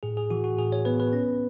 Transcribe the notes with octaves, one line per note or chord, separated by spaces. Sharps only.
A2 G#4
G#4
E3 F#4
F#4
A2 G#4
C#5
B3 B4
B4
C#4